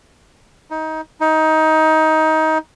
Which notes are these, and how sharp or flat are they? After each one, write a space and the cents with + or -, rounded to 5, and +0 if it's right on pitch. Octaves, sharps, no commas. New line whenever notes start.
D#4 +20
D#4 +20